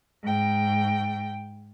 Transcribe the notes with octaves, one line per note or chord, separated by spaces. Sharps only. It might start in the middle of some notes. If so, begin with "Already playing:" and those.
G#2 G5